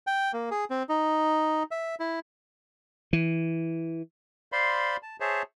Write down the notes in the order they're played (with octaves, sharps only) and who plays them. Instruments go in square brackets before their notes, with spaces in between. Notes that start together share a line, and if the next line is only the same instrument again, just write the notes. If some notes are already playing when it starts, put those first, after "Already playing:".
[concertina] G5
A#3
G#4
C4
D#4
E5
E4
[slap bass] E3
[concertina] C5 D5 F5 B5 C6
A5
G#4 C5 C#5 E5 A5